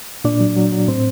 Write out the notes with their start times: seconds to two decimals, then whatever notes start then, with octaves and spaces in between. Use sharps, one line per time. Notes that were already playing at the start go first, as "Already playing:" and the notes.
0.24 A#2 D4 D5
0.40 F#3
0.56 F#3
0.72 F#3
0.88 A2 C4 C5